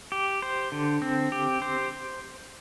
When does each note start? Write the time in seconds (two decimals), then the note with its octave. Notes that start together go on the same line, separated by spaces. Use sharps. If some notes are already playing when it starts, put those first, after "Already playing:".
0.12 G4
0.42 C5
0.72 D3
1.02 C4
1.32 G4
1.62 C5